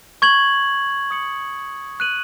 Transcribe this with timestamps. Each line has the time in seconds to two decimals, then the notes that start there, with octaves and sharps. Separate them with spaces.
0.22 C#6 G#6 F#7
1.11 D#6 G#6 C#7 F#7
2.00 F#6 D#7 F#7